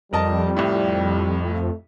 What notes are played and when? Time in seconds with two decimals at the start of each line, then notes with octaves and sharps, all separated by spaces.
0.13 F2 G3 A#4 D#5 A5
0.57 C2 A2
1.46 A3